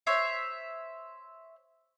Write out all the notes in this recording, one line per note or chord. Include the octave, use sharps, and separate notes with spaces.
C5 C#5 E5